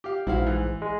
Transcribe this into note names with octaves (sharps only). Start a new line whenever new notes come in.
G4 F5
A#1 G#2 E4 F#4 F5
E3
G#3